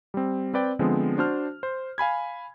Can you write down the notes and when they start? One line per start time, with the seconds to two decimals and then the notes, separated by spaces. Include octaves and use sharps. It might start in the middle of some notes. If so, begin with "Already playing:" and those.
0.14 G3 C4
0.54 C4 B4 D5 G5
0.79 D3 F3 G#3 B3 C4
1.18 D4 F#4 C5 A5 F6
1.63 C5
1.98 F5 G#5 B5 G#6